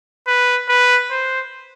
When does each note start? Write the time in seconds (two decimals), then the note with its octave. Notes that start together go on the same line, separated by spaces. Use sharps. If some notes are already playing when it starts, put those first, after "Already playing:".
0.27 B4
0.69 B4
1.11 C5